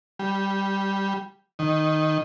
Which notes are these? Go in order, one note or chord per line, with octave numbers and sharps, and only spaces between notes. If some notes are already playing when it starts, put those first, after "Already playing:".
G3
D#3